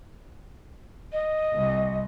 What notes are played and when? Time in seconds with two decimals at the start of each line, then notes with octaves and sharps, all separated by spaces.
1.12 D#5
1.56 C2